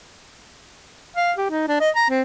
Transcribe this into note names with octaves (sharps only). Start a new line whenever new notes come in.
F5
G4
D#4
D4
D#5
A#5
C4